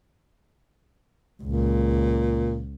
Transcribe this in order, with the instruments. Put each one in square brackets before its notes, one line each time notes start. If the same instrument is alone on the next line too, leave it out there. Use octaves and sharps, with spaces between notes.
[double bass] C#2 [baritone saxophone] A#2